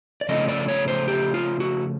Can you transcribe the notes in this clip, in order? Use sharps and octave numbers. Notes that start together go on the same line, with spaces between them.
D5
C#3 F3 A3 C#4 D#5
D5
C#5
C5
G4
F4
F#4